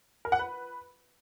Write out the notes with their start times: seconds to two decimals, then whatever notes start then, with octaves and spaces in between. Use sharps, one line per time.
0.25 A#4
0.32 F#5
0.39 B4